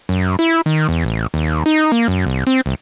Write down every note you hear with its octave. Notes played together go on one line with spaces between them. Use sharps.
F#2
E4
D#3
E2
A1
D#2
D#4
A#3
F#2
C2
C4
C2